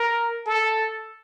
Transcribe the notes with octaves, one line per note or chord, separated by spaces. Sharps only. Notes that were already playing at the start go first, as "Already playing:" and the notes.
Already playing: A#4
A4